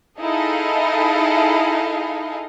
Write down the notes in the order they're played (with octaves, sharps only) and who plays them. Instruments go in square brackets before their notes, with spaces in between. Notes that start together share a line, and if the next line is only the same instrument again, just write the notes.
[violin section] D#4 E4 G#4 A4 D#5 F5